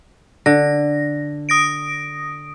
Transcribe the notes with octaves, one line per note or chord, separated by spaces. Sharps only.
D3 A#6
D#6 A#6 D7